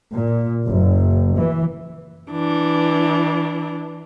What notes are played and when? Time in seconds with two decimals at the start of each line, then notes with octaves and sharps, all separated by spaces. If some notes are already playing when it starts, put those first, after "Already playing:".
0.15 A#2
0.66 F#1
1.37 E3
2.31 E3 D4